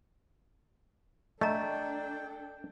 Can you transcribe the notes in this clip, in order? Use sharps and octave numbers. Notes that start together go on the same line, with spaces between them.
A3 D4 A4 D#5 G5 A#5